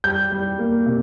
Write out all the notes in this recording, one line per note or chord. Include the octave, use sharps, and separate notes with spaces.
G3 G6
G3
A#3
C3